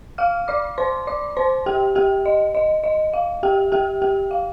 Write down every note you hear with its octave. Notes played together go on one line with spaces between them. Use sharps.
F5 F6
D5 D6
C5 C6
D5 D6
C5 C6
G4 G5
G4 G5
D#5
D#5
D#5
F5
G4 G5
G4 G5
G4 G5
F5